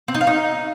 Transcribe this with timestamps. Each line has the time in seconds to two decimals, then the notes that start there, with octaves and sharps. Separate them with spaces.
0.08 C4
0.14 D#4
0.21 F5
0.27 D#4